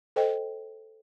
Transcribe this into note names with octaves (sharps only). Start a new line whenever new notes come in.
A4 C5 D#5 G5